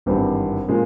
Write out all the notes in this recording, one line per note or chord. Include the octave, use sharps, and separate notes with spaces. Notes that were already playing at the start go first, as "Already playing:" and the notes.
G#1 G2 E3 G3 C4
A#2 F3 G#3 C#4